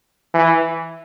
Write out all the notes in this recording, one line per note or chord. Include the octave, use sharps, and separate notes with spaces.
E3